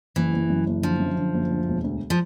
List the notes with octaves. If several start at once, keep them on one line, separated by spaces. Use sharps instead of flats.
F#1 E3
F#1
F#2
F#1
D3 F3
F#2
D3
F#1
D2
E1
D2
F3